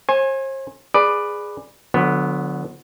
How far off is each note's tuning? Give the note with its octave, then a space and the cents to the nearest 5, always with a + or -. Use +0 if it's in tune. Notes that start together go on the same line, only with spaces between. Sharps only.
C5 +40 G#5 -5
G#4 -5 B4 +0 D5 +10
D3 +0 F#3 -45 B3 +0